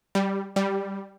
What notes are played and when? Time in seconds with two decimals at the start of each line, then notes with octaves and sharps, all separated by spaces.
0.15 G3
0.56 G3